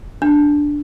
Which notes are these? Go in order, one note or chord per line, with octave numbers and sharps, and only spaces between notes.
D4